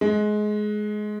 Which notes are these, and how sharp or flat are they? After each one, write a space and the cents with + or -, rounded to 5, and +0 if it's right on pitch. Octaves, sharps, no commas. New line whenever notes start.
G#3 +20